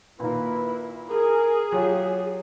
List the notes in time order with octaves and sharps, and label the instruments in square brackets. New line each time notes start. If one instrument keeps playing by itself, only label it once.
[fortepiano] A#2 D#3 A#3 [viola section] E4 [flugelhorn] B4
[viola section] G#4 [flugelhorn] A#4
[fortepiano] F#3 F4 [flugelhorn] G4